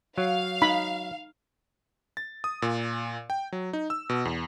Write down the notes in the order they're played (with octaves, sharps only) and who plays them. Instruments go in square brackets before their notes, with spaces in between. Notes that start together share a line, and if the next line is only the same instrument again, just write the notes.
[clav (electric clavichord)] F#3 [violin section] F5
[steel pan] D#4 B5
[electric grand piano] A6
D#6
A#2
G5
F#3
D#4
E6
B2
E2